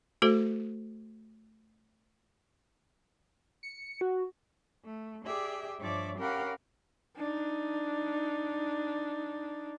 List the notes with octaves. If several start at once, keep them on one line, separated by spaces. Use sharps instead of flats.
A3 F#4 A4 C5
C#7
F#4
A3
G4 G#4 D5 E5
G2 F3 C#5 D5 E5 D6
C#4 G4 A#4 F5 F#5 B5
D4 D#4